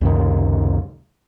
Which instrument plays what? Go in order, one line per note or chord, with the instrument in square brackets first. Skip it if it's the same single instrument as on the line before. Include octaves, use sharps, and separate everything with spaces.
[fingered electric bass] C#2 F#2 C3 D#3